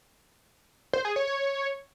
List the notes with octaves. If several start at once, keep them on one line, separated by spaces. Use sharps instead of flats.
C5
G#4
C#5
C#5